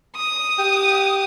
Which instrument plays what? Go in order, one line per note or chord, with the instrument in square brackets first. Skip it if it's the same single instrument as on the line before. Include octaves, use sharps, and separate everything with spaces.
[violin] D#6
[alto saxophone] G4